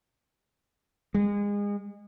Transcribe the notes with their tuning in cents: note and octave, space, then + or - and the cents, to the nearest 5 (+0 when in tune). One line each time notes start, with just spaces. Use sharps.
G#3 -30